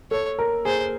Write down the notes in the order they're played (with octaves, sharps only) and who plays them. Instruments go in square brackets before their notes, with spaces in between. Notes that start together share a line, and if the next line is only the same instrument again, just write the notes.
[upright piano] A4 [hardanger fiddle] C#5
[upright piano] A#4
[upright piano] G#4 [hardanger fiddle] C5